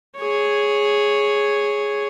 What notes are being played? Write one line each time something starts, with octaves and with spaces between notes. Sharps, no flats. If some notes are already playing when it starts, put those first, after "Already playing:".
G#4 C#5